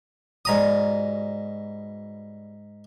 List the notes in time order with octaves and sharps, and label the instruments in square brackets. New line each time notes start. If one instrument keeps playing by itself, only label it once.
[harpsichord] G#2 A#5 D#6 [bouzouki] B2 G3 D5